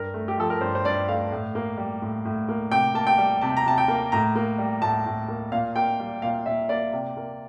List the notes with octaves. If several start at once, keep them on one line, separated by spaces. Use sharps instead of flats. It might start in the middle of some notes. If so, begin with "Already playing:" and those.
Already playing: G2 A#4
A3
G4
F3 A4
A#4
G2 C5
C5
G2 D5
A3 F5
A2
A#3
G3
A2
A2
A#3
C3 G5
A#3 A5
G5
G3
C3 A5
A#5
C3 A5
G5
A#3
A2 A#5
A#3
G3
A2 A5
A2
A#3
A#2 F5
A#3 G5
G3
A#2 F5
A#2 E5
A#3 D5
C3
A#3